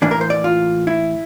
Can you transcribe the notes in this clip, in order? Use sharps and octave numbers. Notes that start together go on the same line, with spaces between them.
A2 E3 A#3 D4
A#4
C5
D5
F4
E4